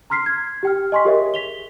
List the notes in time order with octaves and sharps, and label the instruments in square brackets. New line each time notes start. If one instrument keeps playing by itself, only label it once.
[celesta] A#5 C6 F6 B6 C7
G#6
G4 G5 F6
D#5 G#5 C6 C#6 B6
G4 G#4 A#4 C#5 D#5 E5
B6 F7 G7